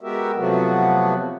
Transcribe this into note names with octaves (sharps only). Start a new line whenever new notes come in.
G#3 B3 F#4 G4 A#4 E5
C3 F3 F#3 A3 B3 F#4